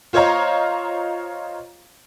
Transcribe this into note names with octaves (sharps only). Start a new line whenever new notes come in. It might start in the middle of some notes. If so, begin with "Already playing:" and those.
F4 C5 C#5 D#5 F5 A#5